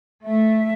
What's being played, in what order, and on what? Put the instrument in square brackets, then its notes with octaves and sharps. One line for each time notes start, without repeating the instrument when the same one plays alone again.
[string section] A3 [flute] E5